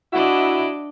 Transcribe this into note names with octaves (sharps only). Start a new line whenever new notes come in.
D4 E4 F#4 D5 D#5